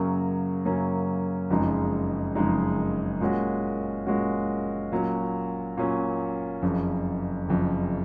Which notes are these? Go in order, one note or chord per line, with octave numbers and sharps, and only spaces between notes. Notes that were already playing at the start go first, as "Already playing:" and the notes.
Already playing: F#2 C#3 F#3 A#3 C#4
F#2 C#3 F#3 A#3 C#4
F#1 F2 C#3 G#3 D#4
F#1 F2 C#3 G#3 D#4
A#2 G#3 C#4 F#4
A#2 G#3 C#4 F#4
A#2 F#3 C#4
A#2 F#3 C#4
F#1 F2 C#3
F#1 F2 C#3